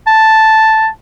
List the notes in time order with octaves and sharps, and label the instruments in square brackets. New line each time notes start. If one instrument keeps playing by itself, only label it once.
[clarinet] A5